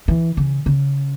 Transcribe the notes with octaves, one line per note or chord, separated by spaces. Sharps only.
E3
C#3
C#3